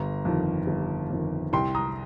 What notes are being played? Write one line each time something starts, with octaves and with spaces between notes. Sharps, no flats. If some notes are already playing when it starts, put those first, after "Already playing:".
Already playing: G1 A#5
F2 D#3
G1
F2 D#3
C2 G5 C6
A#5 D#6